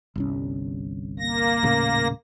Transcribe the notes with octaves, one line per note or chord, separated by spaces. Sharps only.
G1 C2 C#4
A#3 A#6
D#1 A2 C#3